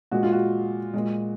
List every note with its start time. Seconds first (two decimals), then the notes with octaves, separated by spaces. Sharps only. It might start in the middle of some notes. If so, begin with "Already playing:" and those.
0.12 A#2 G#3 F#4
0.23 F4
0.32 F#4
0.94 A#2 G#3